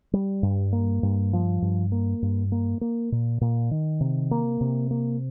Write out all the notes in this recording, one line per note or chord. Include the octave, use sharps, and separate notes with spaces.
G3
G2
A#3
G2
F3
G2
A#3
G2
A#3
A#3
A#2
A#2
D#3
C3
A#3
C3
A#3